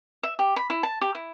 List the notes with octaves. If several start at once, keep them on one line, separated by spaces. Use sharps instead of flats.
E5
G4
B5
E4
A5
G4
E4